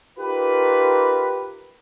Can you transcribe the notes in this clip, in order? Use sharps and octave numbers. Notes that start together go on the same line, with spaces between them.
D#4 F4 G4 A#4 B4